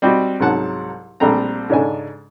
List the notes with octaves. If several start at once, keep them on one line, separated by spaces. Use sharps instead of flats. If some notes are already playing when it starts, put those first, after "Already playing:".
G3 C4 D#4 F#4
C2 G#2 F#3 F#5 A5
A#1 G3 A3 C4 A#5
G#2 C#3 G#3 D4 A4 G#5